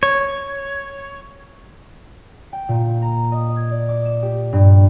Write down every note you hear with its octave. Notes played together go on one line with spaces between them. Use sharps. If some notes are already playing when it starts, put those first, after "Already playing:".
C#5
G5
A#2
A#5
D#5
G#6
D5
D6
E7
G4
G2